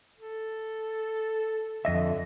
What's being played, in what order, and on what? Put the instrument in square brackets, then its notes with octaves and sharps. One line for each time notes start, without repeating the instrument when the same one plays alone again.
[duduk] A4
[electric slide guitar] F2 D#5 E5 [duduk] D3